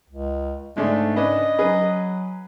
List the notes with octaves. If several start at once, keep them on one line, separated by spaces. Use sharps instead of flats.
C#2
G#2 D3 G#3 A3 D4
C#4 D4 B4 D#5
F#3 C#4 G#4 B4